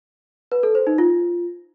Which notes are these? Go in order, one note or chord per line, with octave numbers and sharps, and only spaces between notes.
B4
A4
C5
D#4
F4